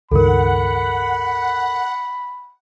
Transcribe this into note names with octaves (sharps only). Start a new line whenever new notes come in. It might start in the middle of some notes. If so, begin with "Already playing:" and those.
C#2 G2 D#3 A4 A#4 F#5 B5